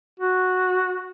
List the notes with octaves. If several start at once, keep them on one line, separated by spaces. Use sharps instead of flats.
F#4